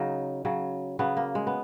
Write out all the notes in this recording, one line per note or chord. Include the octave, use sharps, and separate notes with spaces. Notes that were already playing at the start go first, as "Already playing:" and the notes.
Already playing: C#3 F#3 D#4
C#3 F#3
C#3 F#3 B3
A#3
G#3
B3